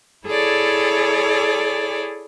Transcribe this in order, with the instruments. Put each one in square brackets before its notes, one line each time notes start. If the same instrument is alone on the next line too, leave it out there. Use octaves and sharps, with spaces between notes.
[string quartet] E4 G#4 A4 C#5 D5